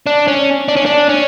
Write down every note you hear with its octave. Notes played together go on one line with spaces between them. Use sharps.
D4
C#4
D4
C#4
D4
C#4